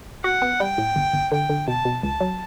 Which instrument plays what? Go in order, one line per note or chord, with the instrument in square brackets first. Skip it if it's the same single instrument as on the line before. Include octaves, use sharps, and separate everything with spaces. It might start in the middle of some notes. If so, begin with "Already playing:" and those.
[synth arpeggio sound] F#4 [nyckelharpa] F#5
[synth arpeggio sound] B3
[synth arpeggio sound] G3 [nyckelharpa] G5
[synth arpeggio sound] A2
G1
G1
[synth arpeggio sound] D3 [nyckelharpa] G5
[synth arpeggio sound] D3
[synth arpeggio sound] B2 [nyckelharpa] A5
[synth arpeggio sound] B2
[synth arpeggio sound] C#2 [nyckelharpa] A5
[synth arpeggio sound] F#3